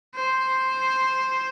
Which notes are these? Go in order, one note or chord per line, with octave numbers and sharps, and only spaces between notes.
C5